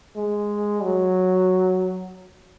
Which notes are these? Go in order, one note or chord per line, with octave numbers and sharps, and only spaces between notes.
G#3
F#3